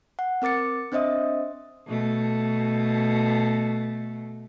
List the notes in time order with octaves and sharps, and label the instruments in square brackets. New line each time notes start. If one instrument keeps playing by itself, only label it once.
[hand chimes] F#5
C4 A#4 D6 A6 C#7
C4 D4 C5 D#5 E5 D#6
[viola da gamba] B2 A3